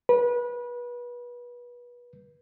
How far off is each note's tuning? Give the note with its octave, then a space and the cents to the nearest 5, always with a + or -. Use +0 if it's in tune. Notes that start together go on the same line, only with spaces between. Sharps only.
B4 -30